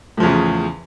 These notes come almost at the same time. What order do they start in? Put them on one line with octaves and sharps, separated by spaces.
A2 F3 E2 C#3